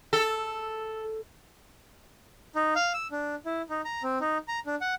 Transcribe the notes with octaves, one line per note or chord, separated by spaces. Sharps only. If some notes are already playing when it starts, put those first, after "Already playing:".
A4
D#4
F5
E6
D4
E4
D#4
A#5
C4
D#4
A#5
D4
F#5